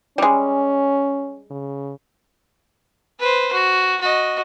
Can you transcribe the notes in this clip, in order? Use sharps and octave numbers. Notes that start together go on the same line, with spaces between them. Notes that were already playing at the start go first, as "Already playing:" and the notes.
G3 G#3 C#4
C#3
B4 C5
F#4
F#4 D#5